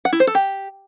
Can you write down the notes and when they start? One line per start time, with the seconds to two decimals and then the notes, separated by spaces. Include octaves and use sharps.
0.05 F#5
0.13 E4
0.20 C5
0.27 A4
0.35 G4